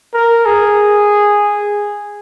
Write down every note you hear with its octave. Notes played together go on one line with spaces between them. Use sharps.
A#4
G#4